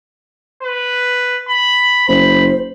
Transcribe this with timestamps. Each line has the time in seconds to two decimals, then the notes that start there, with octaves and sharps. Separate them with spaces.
0.63 B4
1.49 B5
2.08 F#1 C5 B5